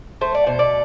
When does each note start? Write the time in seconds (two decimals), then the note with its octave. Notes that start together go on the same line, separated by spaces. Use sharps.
0.21 A3 C5
0.34 D5
0.46 B2 C5
0.59 D5